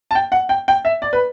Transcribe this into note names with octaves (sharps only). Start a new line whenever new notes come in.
A5
G5
F#5
G5
G5
E5
D5
B4